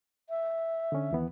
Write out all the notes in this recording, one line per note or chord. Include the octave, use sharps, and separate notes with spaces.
E5
D3 C#4
D#2 E3 B3